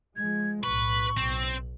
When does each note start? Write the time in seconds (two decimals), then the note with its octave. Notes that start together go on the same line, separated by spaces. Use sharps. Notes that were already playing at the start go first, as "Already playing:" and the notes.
0.17 F3 G#3 G#6
0.63 B1 A2 B4 C#6
1.17 B1 C4